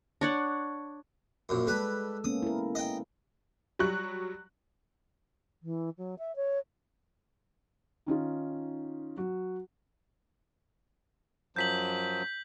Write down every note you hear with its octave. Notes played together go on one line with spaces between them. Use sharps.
D4 C#5 F#5
A#1 F#2
G3 G#3 A4 B4
A#3 B3 C#4 D#6
E4 A#4
D#5 G5
F#3 G3 C#6 F#6
E3
F#3
E5
C#5
D#3 C#4 D#4 F4
F#3 F#4
F#2 F3 F#3 G6 B6 F#7